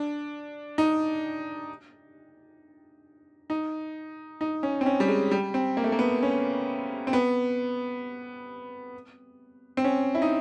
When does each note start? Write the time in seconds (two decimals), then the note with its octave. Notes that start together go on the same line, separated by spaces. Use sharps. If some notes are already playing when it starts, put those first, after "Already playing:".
Already playing: D4
0.78 D#4
3.50 D#4
4.41 D#4
4.63 C#4
4.81 C4
4.86 C#4
5.00 G3
5.08 G#3
5.31 G3
5.54 C4
5.77 A#3
5.84 A3
5.92 A#3
5.99 B3
6.23 C#4
7.07 C4
7.13 B3
9.77 C4
9.84 C#4
10.15 E4
10.22 D#4